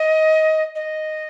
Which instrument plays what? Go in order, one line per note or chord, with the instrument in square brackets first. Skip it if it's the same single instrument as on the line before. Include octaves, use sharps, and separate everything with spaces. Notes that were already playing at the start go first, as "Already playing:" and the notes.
Already playing: [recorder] D#5
D#5